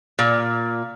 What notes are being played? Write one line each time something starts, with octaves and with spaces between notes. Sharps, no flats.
A#2